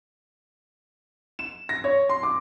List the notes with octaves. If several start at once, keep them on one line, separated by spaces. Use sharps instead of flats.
E7
A#6
C#5
C6
D6